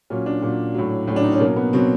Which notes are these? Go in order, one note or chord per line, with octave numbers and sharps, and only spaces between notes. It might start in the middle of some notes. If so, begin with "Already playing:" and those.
A#2 F#3 C#4
D4
A#2 F#3
A2 F#3
A2 F#3 C#4 D4
D#4
C#4
B2 F#3 A#3
B3
B2 F#3 C4